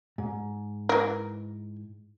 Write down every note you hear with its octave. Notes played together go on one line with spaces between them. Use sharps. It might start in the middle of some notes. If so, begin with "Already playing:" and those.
G#2
E3 A#4